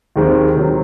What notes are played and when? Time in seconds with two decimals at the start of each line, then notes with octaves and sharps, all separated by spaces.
0.16 D#2 D#3 G#3 C4
0.55 C3 D#3 F#3